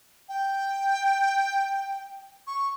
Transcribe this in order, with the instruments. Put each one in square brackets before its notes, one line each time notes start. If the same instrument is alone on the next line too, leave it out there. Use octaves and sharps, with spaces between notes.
[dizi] G5
C#6